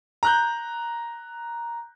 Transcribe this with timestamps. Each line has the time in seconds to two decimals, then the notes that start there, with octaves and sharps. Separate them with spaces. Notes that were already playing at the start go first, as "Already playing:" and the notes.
0.23 A#5 F#6 G6